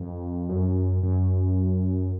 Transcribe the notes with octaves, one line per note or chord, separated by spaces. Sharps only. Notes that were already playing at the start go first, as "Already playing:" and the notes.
Already playing: F2
F#2
F#2